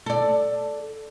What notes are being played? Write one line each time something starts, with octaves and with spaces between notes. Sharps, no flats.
A4 D5